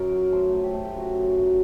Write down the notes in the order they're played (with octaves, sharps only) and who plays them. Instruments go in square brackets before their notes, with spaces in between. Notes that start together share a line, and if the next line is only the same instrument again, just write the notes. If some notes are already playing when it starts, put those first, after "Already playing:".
Already playing: [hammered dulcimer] F#2 A#4
F#3
A3 C5
F#3
G4
A3
G4
F#2 F#4
F#2
F#3